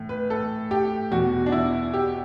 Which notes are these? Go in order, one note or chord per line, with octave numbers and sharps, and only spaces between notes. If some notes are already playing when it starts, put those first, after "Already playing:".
Already playing: A2 E3
B4
A4
G4
E2 B2 F#4
D4
E4
G4